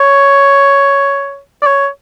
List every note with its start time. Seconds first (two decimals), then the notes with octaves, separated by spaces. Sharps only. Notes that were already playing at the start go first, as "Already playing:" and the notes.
Already playing: C#5
1.62 D5
1.67 C#5